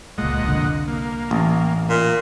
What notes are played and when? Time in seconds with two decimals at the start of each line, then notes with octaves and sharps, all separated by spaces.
0.18 C#2 A#2 G#3 D#5 F#5
0.43 C2 F2 D3
0.88 A#3
1.31 A1
1.90 A#2